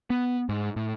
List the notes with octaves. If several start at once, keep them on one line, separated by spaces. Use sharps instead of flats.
B3
G#2
A2